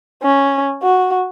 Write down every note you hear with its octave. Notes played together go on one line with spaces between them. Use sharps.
C#4
F#4